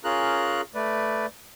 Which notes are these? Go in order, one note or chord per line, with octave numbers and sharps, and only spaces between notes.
C#4 F4 G#4 A#4 A#5 F#6
A3 B4 D5